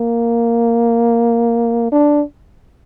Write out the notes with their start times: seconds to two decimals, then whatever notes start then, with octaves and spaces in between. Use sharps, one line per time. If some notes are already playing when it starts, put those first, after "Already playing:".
Already playing: A#3
1.92 D4